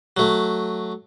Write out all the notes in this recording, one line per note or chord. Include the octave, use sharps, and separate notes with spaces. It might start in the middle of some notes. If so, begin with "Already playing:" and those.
F#3 A3